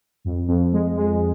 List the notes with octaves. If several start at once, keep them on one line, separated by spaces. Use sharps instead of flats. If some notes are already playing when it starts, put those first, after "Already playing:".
F2
F2
G#3
G#3